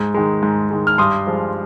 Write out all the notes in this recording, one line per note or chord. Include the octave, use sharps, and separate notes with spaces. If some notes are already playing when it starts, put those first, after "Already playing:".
Already playing: G#2
D#3 G#3
G#2
D#3 G#3
F6
G2 C6 D#6
F3 G#3